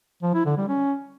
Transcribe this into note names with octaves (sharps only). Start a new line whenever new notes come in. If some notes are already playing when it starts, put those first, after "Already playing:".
F3
E4
D3
G3
C#4